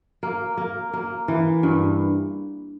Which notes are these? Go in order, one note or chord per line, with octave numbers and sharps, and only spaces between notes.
A#3
A#3
A#3
E3
G2